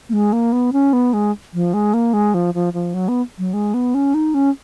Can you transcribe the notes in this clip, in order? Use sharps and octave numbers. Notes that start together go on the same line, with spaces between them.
A#3
G#3
A#3
B3
C#4
B3
G#3
F3
G#3
A#3
G#3
F3
F3
F3
F#3
B3
F#3
G#3
B3
C#4
D#4
C#4